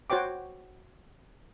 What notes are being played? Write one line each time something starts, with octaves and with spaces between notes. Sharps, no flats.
F#4 C5 C#5 G5 D6